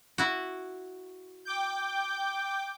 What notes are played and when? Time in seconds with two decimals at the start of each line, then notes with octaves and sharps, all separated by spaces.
0.18 E4 F#4
1.45 G5 D6 G6